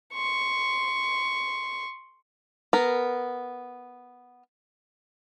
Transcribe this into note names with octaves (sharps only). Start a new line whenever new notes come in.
C6 C#6
B3 A#4